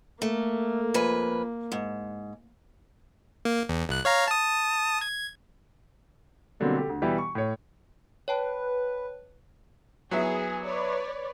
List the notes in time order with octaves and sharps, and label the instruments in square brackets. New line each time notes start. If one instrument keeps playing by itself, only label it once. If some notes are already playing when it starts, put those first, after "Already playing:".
[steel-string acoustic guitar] A3 [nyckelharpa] A#3
[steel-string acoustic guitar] F2 B4 G#5
G#2
[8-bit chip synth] A#3
E2
C2 F#6
C#5 F5 A#5
A5 D#6
G#6
[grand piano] B2 D3 F#3 G3 A#3 C4
G4 A4
D2
B2 E3 G3 B3 E4 G4
C#6
A2 C#5
[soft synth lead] B4 [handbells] C#5 G5 A5
[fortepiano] F#3 B3 E4 [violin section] G#4
[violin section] B4 C#5 D5